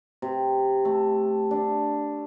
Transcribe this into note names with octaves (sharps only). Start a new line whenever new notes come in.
C3
A3
D4